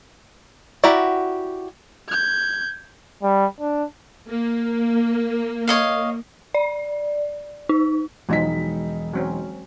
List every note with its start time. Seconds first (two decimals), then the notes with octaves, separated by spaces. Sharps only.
0.84 E4 F#4 G4 D5 A#5
2.08 G6 G#6
3.23 G3
3.61 D4
4.29 A#3
5.68 C#5 D#5 F5
6.54 D5
7.69 D#4
8.29 E1 F3 F#3 G#3 D#4 B6
9.13 F#3 C4 C#4